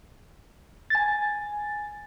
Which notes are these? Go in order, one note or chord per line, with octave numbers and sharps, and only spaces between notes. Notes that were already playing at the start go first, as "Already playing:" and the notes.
G#5 A6